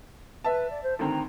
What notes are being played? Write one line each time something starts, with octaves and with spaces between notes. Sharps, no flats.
B4 E5 A5
D5
C5
D2 D#3 C4 A#5